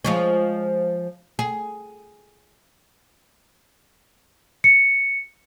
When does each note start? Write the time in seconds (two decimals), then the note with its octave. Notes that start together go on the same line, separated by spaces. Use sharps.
0.04 F3 G#3 C#4
1.39 G#4
4.64 C#7